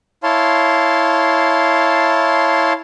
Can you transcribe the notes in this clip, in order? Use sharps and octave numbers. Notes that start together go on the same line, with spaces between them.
E4 C#5 F5 A5 C6